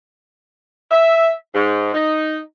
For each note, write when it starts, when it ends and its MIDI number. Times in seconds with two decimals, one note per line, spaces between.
0.91 1.30 76
1.55 1.93 44
1.94 2.38 63